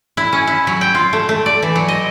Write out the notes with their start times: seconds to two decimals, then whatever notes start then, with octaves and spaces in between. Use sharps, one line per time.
0.17 E4
0.33 C#4
0.47 E4
0.67 F#3
0.81 G5
0.95 F4
1.13 A3
1.29 A3
1.46 D5
1.62 E3
1.76 F#3
1.88 D#5